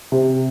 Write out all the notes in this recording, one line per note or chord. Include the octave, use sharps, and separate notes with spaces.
C3